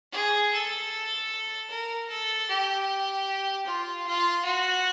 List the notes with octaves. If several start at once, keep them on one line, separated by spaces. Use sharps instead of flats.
G#4
A4
A#4
A4
G4
F4
F4
F#4